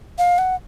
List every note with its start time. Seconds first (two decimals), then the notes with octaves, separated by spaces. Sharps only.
0.18 F5
0.38 F#5